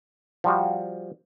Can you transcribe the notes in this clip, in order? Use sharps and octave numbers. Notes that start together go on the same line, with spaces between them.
F3 G3 F#4